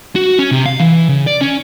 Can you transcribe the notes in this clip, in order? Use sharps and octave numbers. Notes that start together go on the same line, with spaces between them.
F#4
C#4
C3
F5
E3
C#3
D5
C#4